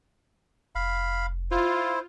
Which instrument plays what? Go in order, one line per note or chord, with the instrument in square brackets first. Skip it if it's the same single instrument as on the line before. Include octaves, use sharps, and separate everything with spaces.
[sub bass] F1 [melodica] F5 B5
[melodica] E4 C5 [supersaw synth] F4